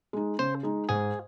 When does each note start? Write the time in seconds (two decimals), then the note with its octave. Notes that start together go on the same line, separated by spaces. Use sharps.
0.13 G#3 D#4
0.39 C#3 C5
0.63 G#3 D#4
0.89 G#2 G#4